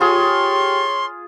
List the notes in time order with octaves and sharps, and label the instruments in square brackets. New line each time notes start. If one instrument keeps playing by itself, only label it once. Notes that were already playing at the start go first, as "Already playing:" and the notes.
[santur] F4 G#4 [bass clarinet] G4 [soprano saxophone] C#5 [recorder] C6